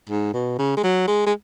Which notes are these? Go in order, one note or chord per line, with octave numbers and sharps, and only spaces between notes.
G#2
B2
C#3
G#3
F#3
G#3
G#3